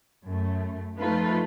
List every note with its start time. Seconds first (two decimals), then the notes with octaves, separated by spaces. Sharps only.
0.24 F#2 A3
0.99 F3 A3 D#4 F4 A4 B4